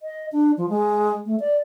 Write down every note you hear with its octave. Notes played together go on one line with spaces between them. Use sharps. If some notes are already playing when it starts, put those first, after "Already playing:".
D#5
D4
F3
G#3
A3
D5